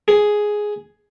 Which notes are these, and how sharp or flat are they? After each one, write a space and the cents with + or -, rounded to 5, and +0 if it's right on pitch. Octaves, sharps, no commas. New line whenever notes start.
G#4 +5